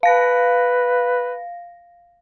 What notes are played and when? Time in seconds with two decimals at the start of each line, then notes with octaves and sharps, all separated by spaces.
0.03 B4 F5 A#6